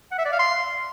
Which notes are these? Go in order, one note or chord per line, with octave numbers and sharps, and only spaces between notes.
F#5
E5
D5
F5
C6